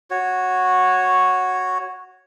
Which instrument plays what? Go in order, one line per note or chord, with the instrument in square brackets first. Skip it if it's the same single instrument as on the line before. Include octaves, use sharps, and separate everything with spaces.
[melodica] F#4 C#5